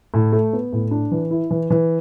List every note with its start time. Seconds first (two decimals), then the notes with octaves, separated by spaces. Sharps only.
0.14 A2
0.32 A3
0.53 B3
0.73 A2
0.91 D4
1.12 E3
1.31 E4
1.51 E3
1.70 E3